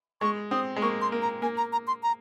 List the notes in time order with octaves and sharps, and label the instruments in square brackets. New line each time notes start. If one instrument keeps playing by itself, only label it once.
[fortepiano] G#3 [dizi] C#6
[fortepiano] C4 [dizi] D#6
[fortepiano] G#3
[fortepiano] A#3 [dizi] C#6
[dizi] C6
[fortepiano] A#3
[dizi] A#5
[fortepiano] A#3 [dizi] G#5
[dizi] A#5
A#5
C6
A#5